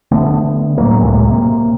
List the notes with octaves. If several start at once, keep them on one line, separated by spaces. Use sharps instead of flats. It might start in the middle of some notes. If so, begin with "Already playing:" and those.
D3 A3 B3
A2 F#3 A#3
C#2 A2 C3 G#3
C3 A#3